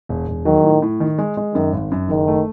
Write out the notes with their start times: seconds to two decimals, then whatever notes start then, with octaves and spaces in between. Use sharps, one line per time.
0.09 E1
0.28 E1
0.45 D#3 F#3
0.64 A2
0.82 A2
1.00 D#3
1.18 G#3
1.37 G#3
1.55 F#2 D#3
1.73 G#1
1.92 F#2
2.09 F#1 D#3
2.28 A3